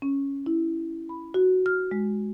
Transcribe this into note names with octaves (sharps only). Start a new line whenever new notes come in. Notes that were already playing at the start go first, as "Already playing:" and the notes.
C#4
E4
B5
F#4
F6
G#3